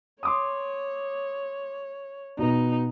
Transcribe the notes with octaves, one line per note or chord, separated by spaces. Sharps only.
C#5 C6 D6 D#6
B2 B3 D#4